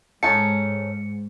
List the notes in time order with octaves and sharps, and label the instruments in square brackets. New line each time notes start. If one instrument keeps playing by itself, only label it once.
[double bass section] G#2 [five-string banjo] C#4 D#4 A4 [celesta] C#7